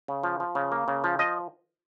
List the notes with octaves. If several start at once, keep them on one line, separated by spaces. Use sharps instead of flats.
C#3
F3
F3
C#3
A#3
C#3
F3
F3 D#5